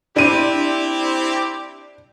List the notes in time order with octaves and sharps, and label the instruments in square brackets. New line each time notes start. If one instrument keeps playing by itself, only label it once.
[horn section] C4 E4 G4 [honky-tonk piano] D4 D#7